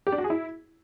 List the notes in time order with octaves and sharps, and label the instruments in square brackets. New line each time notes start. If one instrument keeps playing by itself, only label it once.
[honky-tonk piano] G4
D4
F#4
G#4
E4